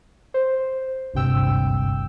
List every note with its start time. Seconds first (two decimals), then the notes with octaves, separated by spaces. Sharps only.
0.34 C5
1.14 G#1 D2 G2 C3 G5 E6